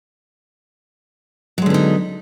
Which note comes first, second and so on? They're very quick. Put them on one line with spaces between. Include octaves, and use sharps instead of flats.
F#3 G#3 D3 B3 D#4